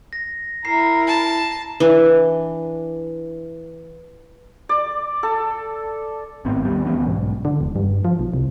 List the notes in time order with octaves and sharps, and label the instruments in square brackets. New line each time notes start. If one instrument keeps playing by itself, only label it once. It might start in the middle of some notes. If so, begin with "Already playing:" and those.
[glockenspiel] A#6
[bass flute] E4 [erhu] A#4 [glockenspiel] A#5 C7
[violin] A5
[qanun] E3 D4
[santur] D5
A4
[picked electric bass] G#1 A2 B3 C4
D#2 G3 B3
D2 E3 B3 C#4
B1 G#2
[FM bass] D3
E1
G2
F3
B1
C2